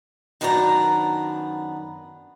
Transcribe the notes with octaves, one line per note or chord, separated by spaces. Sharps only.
F#2 D#3 B3 D4 D5 A#5